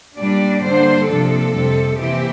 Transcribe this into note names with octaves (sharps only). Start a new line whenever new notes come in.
A#2 G3 D4 D5
G2 D3 G3 A#3 D4 C5
C3 F3 A#3 D4 A4
F2 C3 G3
C3 E3 A#3 E4 G4